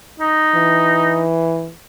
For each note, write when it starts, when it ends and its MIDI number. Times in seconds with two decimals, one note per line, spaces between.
0.20 1.24 63
0.55 1.71 52